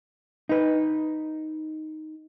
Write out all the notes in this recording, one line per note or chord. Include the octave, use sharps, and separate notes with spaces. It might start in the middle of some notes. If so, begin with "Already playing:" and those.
D#4 B4